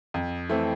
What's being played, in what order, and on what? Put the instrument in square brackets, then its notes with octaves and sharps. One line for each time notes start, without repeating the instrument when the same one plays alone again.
[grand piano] F2
E3 A3 C4